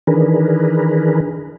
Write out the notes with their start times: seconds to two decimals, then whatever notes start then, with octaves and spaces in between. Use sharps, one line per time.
0.07 D#3 E3 D4 G#4 A#4 B4